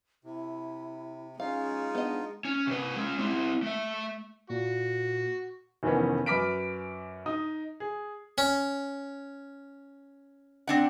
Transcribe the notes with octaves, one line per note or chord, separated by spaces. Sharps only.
C3 E4
G#3 C#4 D#4 F4 F5
B3 D4 D#5
C#4
C3 B4
G#3 C#4
C4 E4
A3 E5
A#2 F#4
F1 D#3 E3 B3 C#4
F#2 B4 D6 F6 B6 D7
D#4 D#6
G#4
C#4
C4 D4 F#5